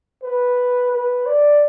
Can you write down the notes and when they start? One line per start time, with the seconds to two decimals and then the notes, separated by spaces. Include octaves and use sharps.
0.23 B4
0.92 B4
1.26 D5